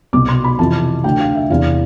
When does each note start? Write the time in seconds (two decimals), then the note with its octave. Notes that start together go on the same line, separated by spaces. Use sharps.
0.13 C2 B2 D6
0.29 C6
0.44 B5
0.59 F2 C3 E3 A5
1.04 D2 D3 G5
1.20 F5
1.35 E5
1.50 E2 C3 E3 F5